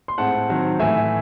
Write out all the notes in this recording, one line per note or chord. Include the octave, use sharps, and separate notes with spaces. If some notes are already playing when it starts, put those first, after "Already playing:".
C6
A2 G#3 C4 F#5 A5
D#3 F#3 C4
A2 E3 A3 E5 G#5